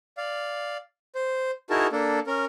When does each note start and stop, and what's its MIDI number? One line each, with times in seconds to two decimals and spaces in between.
0.17 0.77 74
0.17 0.77 77
1.15 1.51 72
1.70 1.87 63
1.70 1.87 64
1.70 1.87 66
1.70 1.87 68
1.70 1.87 70
1.70 1.87 81
1.92 2.19 58
1.92 2.19 62
1.92 2.19 69
2.27 2.45 61
2.27 2.45 70